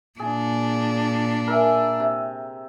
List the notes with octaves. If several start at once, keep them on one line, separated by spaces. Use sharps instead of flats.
A#2 D4 G#4
A#4 E5 G#5
C3